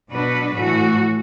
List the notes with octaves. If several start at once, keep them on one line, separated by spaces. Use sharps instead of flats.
B2 F#3 D4 F#4 B4
A2 E3 A3 F#4